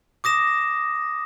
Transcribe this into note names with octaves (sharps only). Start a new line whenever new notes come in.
D6 D#6 A#6 E7